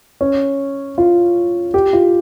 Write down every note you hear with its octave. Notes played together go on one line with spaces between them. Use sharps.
C#4
F4
G4
F4